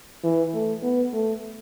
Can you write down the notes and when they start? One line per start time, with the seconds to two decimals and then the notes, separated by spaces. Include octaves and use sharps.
0.24 E3
0.54 A3
0.82 B3
1.13 A3